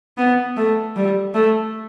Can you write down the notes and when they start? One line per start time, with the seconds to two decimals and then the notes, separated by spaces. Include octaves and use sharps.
0.18 B3
0.57 A3
0.96 G3
1.34 A3